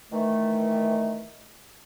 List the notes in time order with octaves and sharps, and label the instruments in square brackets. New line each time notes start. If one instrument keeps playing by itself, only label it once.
[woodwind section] D#3 E3 A3